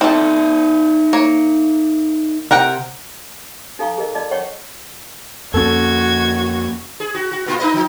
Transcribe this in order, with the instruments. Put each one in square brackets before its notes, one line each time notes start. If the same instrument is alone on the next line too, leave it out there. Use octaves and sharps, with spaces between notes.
[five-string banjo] C4 A4 [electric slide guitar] D#4 D5 E5
[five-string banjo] A#3 C#5
[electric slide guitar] C3 [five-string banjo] A#4 F#5 G5
[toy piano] D#4 A4 F5 A#5 C#6
G#4 A#4 D#5
F4 D5 D#5 A5 D6
C#5 D#5 F#5 G5 C#6
[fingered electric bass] F2 A#3 [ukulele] C#4 A4 [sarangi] F#4 [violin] G#6
[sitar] G#4
F#4
F#4
B2 A#3 F4
D#4 B4 D#5
F3 D#4